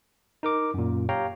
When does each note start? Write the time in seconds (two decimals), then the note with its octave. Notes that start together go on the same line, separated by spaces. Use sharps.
0.43 D#4 A#4 D6
0.74 F#2 A#2
1.09 G4 C#5 F5 G5 A#5